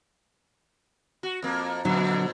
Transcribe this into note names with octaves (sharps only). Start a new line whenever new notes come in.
F#4
F2 A#3
F2 A#2 D3 F#3